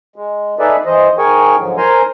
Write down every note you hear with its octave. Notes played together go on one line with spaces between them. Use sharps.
G#3
D#4 G#4 A4 B4 D5 E5
E3 C5 D#5
G#2 G#4 A#4 G5 G#5 C#6
G#2 D3 F3 F#3
A#4 C5 G#5 A#5 C6